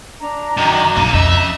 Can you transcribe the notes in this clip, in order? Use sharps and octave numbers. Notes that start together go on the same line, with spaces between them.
D4 A#5
F#2 D#3 F#3
B1 F#2 A#3 D#4
F2 C#4 D#5 E5